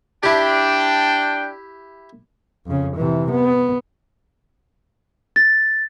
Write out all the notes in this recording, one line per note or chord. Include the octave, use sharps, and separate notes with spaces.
D4 E4 G4 G5
F2 C#3
C3 E3
B3
A6